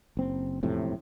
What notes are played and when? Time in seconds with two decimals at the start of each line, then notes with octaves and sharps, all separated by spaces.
0.17 F#1 C4
0.63 E1 F2 A2 C3